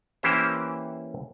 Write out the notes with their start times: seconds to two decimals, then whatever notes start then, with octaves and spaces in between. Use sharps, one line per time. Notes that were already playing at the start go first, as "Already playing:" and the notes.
0.23 E3 A#3 C#4 G4 C5